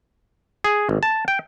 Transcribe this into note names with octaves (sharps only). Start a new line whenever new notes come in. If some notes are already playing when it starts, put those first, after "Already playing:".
G#4
G#1
A5
G5